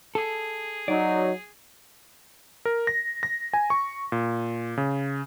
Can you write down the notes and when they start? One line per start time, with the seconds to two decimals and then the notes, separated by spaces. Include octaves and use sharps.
0.15 G#4 A4
0.88 F#3 D#4 D5
2.65 A#4
2.87 A#6
3.23 A#6
3.53 G#5
3.70 C#6
4.12 A#2
4.77 C#3